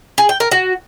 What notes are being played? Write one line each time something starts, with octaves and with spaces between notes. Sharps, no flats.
G#4
G5
A#4
F#4